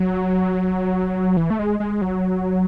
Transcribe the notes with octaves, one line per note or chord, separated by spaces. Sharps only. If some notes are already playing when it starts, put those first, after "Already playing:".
Already playing: F#3
E3
A3
G#3
G#3
F#3